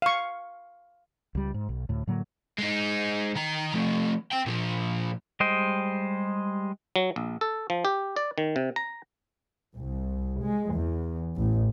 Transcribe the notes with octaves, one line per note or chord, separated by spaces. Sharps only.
F5 C#6
C#2 G3
G#2
B1
D2 A2
A2 D3 F#3 A#3
G#3 D#4
D#3 A#5
F3 A3
C4 G5
A#2 F3
G3 G#3 C5 D#5 G5
F#3
A#1
A4
F3
G4
D5
D#3
C3
A#5
C2
G#3
E2
A1